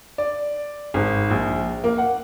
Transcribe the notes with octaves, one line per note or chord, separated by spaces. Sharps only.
D5
G#1
A#1
A#3
F#5